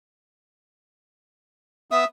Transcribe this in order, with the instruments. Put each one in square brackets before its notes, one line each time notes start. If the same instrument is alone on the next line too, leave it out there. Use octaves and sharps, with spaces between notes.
[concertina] B3 D#6 [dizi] E5